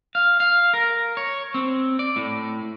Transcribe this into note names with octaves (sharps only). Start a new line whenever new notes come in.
F5
F5
A#4
C#5
C4
D5
A2